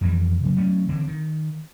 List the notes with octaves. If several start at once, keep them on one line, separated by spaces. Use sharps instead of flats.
F2 E3 G3
C#3 F#3
F#3 A3 C#4
D3 E3 C4
D#3